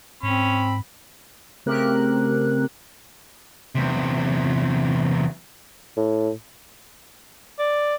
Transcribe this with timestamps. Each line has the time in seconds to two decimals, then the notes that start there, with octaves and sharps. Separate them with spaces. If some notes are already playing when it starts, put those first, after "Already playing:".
0.23 G#2 C4 C#4 B5
1.66 C#3 A3 C4 G4 A#4 F#6
3.75 E2 C3
5.97 A2
7.59 D5